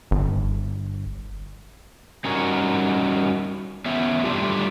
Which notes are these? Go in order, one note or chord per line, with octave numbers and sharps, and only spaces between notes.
G1
G3 C#4 D#4 F#4 A#4 C#5
B3 C#4 E5
G3 A3 D4 F4 G4